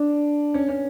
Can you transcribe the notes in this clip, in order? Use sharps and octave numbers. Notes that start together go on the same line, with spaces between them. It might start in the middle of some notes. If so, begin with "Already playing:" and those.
Already playing: D4
C#4
C#4